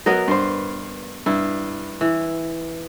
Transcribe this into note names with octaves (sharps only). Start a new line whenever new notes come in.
F#3 B3 A#4 D#5
G2 C5
G2 E4
E3